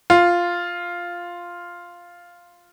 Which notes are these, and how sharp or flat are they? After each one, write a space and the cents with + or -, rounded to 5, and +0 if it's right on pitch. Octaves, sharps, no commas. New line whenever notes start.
F4 +0